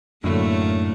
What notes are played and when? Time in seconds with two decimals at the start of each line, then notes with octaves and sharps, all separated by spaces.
0.24 F#2 A2 D3 F#3 A3 A#3